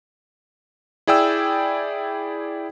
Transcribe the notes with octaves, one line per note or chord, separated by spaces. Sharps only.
E4 G#4 D5 G5 E6